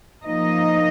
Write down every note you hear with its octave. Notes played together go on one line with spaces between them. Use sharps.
F3 A#3 D#4 D#5